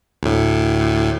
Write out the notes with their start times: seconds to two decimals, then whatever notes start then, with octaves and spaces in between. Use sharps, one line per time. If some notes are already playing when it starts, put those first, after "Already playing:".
0.23 D2 A2